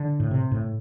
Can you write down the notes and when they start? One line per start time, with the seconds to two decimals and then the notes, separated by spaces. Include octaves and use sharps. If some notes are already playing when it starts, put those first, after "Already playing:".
Already playing: D3
0.20 A2
0.31 C3
0.51 A2